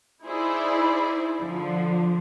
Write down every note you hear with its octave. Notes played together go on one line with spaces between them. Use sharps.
D#4 E4 G#4 C5 D5
D3 F3